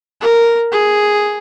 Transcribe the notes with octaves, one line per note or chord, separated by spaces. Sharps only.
A#4
G#4